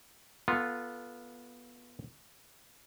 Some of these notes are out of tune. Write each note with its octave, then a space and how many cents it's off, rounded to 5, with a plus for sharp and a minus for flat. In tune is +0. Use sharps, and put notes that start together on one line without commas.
B3 -15 F4 +0 A4 +0